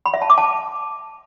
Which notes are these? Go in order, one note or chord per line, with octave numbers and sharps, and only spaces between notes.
B5
E5
A5
D6
A5